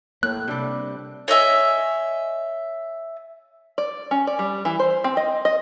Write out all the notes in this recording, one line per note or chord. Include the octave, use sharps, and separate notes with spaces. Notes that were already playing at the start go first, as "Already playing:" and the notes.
A2 A#3 F#6
C3 G3 D4
C#5 D#5 E5 G#5
D5
C#4
D5
G3
E3
C5
C4
D#5
D#5